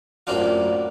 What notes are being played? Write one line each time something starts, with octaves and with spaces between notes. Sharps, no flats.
F#2 A2 A#3 C4 D4 F4